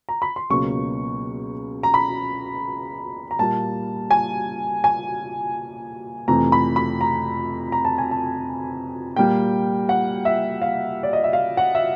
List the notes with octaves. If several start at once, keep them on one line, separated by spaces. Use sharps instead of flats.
A#5
B5
C6
C#2 B2 F#3 A#3 C#6
A#5
B5
A#5
A#2 G3 A#3 A5
G#5
G#5
F2 C3 E3 A3 A#5
B5
B5
A#5
A#5
A5
G#5
A5
A#2 G3 A#3 G5
F#5
E5
F5
D5
D#5
E5
F5
F#5
E5